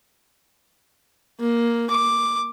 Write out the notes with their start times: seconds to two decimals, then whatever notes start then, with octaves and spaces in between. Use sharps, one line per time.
1.39 A#3
1.90 D6